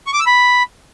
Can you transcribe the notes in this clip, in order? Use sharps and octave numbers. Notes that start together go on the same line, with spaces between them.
C#6
D6
E6
B5